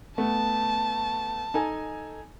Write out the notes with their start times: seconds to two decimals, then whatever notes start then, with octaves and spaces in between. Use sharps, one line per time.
0.18 A3 B3 A5
1.54 D#4 A4 G#5